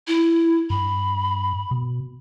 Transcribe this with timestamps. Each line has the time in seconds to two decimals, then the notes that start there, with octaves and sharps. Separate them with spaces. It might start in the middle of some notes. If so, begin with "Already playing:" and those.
0.08 E4
0.70 G2 B5
1.71 B2